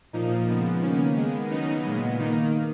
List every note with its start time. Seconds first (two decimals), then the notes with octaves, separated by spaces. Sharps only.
0.13 A#2 F3 A#3 D#4
0.47 C#3 F3 G#3 B3
0.82 D#3 A#3 C#4
1.16 D#3 G#3 B3
1.50 C#3 F#3 B3 D#4
1.84 A#2 G#3 B3
2.19 D#3 A#3 D#4